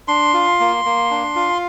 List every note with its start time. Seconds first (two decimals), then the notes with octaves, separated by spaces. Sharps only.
0.08 D4 C6
0.34 F4
0.60 A#3
0.85 A#3
1.10 D4
1.36 F4